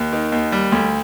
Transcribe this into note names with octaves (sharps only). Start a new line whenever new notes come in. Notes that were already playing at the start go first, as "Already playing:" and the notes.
Already playing: D#2
D#3
D#2
G3
D2